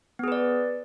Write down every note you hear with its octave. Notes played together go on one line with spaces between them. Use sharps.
B3 G#4 B4 D5